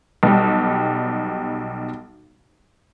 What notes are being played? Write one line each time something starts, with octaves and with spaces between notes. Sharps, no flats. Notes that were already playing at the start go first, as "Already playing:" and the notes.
B1 G3